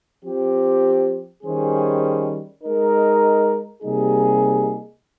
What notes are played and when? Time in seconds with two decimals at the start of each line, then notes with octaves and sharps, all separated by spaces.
0.24 F3 C4 G4
1.44 D#3 G3 C#4 G#4 C5
2.63 G#3 D#4 A#4
3.82 C3 G3 A#3 D#4 G#4